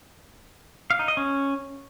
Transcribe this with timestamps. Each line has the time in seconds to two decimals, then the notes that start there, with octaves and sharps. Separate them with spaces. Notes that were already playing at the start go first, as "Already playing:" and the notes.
0.90 F5
0.99 D#4
1.08 D#5
1.17 C#4